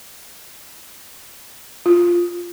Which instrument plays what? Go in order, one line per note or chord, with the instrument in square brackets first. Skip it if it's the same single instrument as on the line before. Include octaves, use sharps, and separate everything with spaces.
[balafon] F4